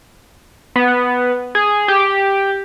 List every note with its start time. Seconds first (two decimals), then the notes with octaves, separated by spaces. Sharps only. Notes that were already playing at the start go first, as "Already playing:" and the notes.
0.76 B3
1.55 G#4
1.88 G4